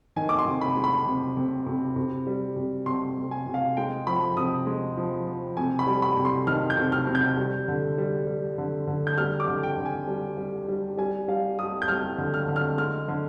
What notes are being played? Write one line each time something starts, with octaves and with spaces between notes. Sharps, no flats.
D#3 G#5
D6
C6
C3
B5
G#3
B5
C3
C3
C3
C3
G3
C3
C3 C6
C3
G#5
C3
F5
G#3 G5
F3 B5
C3 D#6
G#3
F3
F3
C3 G#5
B5
G3
B5
C3
C6
D#3 F6
G6
C3
F6
C3
G6
G3
D3
G3
G3
D3
D3
G6
G3 F6
D6
D3
G5
D3
G#5
G3
G3
G3
G3 G#5
G3 F5
G3 D#6
G6
G3 F6
D3
F6
D3
F6
G#3 F6
D3